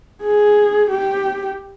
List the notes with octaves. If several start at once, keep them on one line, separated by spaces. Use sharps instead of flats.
G#4
G4